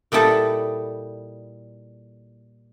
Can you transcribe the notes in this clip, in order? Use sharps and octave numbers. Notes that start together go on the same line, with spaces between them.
A#2 G3 D#4 E4 A4